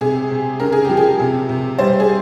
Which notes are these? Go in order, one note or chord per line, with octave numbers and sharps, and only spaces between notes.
C3 G#4
C3
C#3 A#4
G#4
F3 G4
G#4
C3
C3
G3 C5
G#4